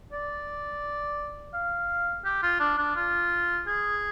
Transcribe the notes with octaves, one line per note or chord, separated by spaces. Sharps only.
D5
F5
G4
F4
D4
D4
F4
G#4